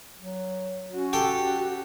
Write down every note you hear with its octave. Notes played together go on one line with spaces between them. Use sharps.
F#3
C#4 F#4
G4 A4 G5